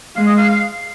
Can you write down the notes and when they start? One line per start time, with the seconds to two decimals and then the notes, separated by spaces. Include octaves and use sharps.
0.16 G#3 F5
0.27 D#5
0.37 F5